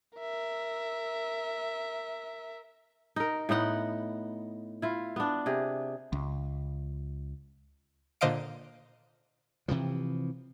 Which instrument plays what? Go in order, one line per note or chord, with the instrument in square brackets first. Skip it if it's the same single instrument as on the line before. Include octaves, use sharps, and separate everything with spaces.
[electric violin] A#4 E5
[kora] D#4 A#4
A2 B3 D#4 F#5
E4 F4
B3 D4
C3 G#4
[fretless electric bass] C#2
[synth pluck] A#2 D3 C5 D#5 F5 D7
[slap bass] C3 E3 F3